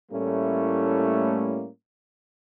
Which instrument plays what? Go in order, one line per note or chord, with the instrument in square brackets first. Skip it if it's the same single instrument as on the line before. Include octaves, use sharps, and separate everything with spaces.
[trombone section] A2 G3 A3 A#3 C#4 E4